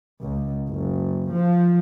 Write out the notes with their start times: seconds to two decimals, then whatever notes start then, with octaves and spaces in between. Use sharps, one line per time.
0.23 C#2
0.67 F#1
1.32 F3